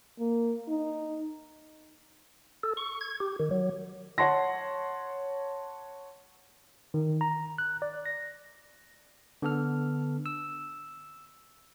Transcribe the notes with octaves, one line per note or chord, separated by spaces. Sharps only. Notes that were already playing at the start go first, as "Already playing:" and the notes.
A#3
D#4
A4
C#6
G#6
G4
D#3
F#3
C#5 F#5 A5 C6 A#6
D#3
A#5
F#6
D5
A#6
D3 B3 A4 F6
E6